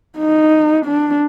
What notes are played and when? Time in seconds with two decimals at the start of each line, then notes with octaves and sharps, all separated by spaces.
0.18 D#4
0.85 D4